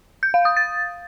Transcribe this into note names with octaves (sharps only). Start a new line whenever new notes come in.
G6
F5
D#6
A6